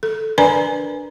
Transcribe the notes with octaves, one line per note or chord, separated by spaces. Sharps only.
A4
D4 A#4 B4 D5 G#5 A#5